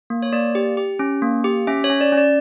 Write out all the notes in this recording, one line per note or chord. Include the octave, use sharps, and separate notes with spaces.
A#3
C#5
A#3 D5
G4
G4
C#4
A#3
G4
C#4 E5
C#5
C#4
D5
C#4 D5